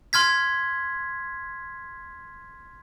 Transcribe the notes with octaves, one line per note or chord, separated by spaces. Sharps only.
C6 F6 G#6 B6